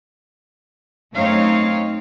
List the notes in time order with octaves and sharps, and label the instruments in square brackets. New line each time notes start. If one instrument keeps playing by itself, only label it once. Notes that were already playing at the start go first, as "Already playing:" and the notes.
[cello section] F#2 A3 C4 D#4 C#5 F5